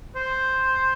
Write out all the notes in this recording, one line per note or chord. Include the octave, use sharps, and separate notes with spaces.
C5